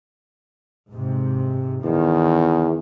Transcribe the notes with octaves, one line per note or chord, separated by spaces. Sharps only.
G#2 C3
E2 D#3